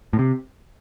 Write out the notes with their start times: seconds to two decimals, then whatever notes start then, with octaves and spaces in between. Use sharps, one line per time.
0.13 A2
0.19 C3